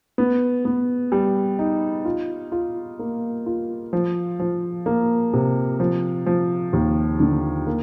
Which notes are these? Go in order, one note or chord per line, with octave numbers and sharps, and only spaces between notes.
B3
B3
G3
D#4
F4
F4
A#3
F4
F3
F3
A#3
C3
F3
F3
D#2
D3
A#3